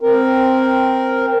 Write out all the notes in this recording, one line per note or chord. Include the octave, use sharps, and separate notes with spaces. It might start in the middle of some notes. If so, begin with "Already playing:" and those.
C4 A#4